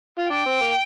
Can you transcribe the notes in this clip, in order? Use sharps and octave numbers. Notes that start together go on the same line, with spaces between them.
F4
D4 G5
C4
A#3